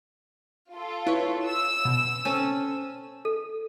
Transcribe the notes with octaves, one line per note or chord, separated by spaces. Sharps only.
F4 A4
E4 B4 C#5
E6
B2
C4 C#4 A4 D#7
A4